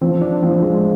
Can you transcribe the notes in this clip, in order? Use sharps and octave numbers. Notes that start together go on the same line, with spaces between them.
F3 C4
D4
F3 C4
G#3